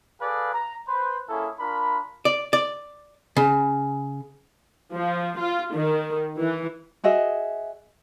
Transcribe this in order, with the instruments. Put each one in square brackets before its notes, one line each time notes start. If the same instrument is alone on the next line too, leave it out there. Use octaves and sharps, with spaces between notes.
[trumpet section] G#4 A4 B4 D5 F5
A#5
B4 C5
A#3 C#4 E4 G#4 A4
D4 F4 A#4 B5
[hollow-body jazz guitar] D5
D5
C#3
[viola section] F3
F4
D#3
E3
[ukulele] F#4 G#4 D#5 E5